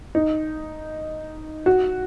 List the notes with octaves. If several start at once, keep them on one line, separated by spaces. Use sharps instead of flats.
D#4
F#4